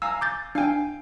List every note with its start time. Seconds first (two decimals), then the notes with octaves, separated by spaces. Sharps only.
0.02 F5 G#5 A#5 E6
0.21 D6 G6 A6
0.55 D4 F5 G5 G#5